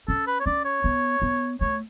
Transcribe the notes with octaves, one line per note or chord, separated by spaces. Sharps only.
C#4 A4
B4
C#5
C#4 D5
C#5
B3
B3
A3 C#5